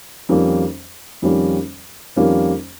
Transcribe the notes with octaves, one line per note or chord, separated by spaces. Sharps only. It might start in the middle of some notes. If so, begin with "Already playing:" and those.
F2 D#3 G3 A#3 C#4
F2 D#3 G3 A#3 C#4
F2 D#3 G3 A#3 C#4